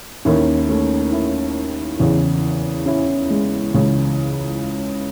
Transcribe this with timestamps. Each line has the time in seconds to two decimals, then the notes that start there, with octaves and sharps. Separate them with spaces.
0.25 D#2 D#3 C#4 E4
0.69 A3 C#4
1.12 C#4 E4
1.99 E2 C#3 E3
2.86 C#4 E4
3.30 G#3
3.74 C#2 C#3 E3